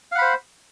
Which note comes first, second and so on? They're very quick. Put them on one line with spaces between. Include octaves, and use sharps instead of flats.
F5 F#5 B5 C5